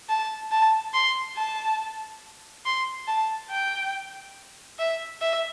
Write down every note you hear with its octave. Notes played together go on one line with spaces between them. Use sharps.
A5
A5
C6
A5
C6
A5
G5
E5
E5